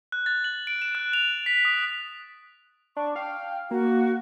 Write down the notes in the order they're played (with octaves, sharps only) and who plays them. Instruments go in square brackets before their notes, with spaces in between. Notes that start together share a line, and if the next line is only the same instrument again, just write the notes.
[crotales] F#6
A6
F#7
D7
E7
F#6
F7
B6
D#6
[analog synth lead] D4 [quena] C#6
[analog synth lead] F5 [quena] G5
[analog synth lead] A#3 [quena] F#4